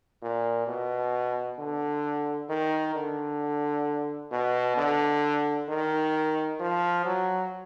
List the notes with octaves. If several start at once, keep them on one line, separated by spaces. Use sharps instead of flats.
A#2
B2
D3
D#3
D3
B2
D3
D#3
F3
F#3